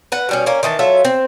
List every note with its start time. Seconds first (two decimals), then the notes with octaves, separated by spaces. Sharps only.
0.12 B4 F#5
0.29 B2 G3 C#4
0.46 A#3 C#4
0.63 D#3 E3 B4 A5
0.79 F#3 F4 A4 E5
1.05 C4